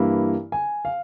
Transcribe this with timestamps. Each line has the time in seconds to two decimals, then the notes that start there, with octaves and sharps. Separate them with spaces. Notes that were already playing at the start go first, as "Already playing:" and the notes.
Already playing: G2 E3 A#3 E4
0.52 G#5
0.85 F5